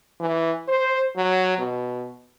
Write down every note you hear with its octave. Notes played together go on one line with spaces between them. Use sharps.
E3
C5
F#3
B2